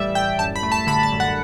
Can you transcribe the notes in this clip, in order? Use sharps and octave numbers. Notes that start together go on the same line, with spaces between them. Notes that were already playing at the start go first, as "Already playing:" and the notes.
Already playing: A2 E3 G3 D5 E5
A2 G5
F#2 A5
B5
A3
A5
D3 B5
A5
F#2
F#5